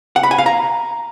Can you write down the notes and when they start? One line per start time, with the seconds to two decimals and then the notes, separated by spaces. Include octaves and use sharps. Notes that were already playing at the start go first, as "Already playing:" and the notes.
0.16 F#5
0.23 B5
0.31 G#5
0.38 F5
0.46 A#5